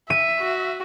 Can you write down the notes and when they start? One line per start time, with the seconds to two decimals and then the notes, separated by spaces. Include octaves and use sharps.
0.10 E5 D#7
0.40 F#4